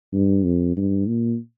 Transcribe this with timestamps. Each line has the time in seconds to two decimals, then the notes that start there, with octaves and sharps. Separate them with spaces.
0.14 G2
0.45 F2
0.77 G2
1.08 A#2